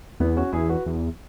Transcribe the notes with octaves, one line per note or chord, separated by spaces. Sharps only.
E2 B3 E4
C#4 F#4
E2 E4 G#4
F#4 B4
E2